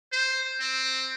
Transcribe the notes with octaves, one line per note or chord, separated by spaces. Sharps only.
C5
C4